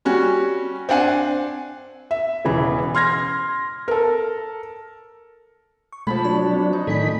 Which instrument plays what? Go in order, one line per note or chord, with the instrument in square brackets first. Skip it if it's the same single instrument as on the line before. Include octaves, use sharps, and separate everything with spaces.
[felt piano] G3 C#4 F#4
C4 D4 F#5 G#5
E5
E1 C#3 E3 B5
C6 F6 G#6 A#6
A4 A#4
[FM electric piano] C#6
[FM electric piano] B2 G#3 A3 [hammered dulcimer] F3 A5 B5
[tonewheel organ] F#3 D4 [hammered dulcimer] C#5 [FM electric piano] B5
[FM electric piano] C4
[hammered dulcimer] D#4 D#5
[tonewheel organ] A2 D#3 B5 [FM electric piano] A4 D5 G#5